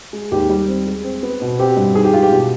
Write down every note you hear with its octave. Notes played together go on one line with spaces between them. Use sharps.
G#3
D#2 G4
G3
C4
G#3
C4
B3
B2
C4 G4
G2
D#3 G#4
G4
G#3 F4
G4
B2